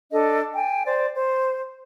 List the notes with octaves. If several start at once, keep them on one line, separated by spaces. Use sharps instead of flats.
D4 A4 D#5
G5 G#5
C5 D5
C5